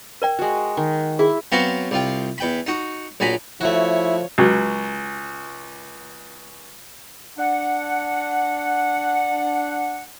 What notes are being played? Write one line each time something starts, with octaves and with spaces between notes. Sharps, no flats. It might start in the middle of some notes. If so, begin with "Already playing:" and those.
A#4 D5 G5
G#3 F#4
D#3
E4 G#4
F#3 B3 C4 F#4 F5 A#5
C2 F4 G5
E2 G5 B5
D#4 F#4
A#1 F#3 G#5 A#5 B5
F3 A3 E4 F#4 C#5
C#2 F#3
D4 F#5